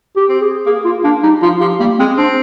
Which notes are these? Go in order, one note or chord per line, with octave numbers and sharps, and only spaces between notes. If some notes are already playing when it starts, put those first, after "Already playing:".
G4
C4
G#4
A#3 G#4
A#3 F4
A#3 D4
G3 D#4
F3 F4
F3 G4
G3 A#3
G#3 C4
C4 D4